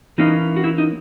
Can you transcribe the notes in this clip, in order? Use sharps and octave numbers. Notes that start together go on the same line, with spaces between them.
E3 A#3 C#4 D#4
F#4
E4
D#4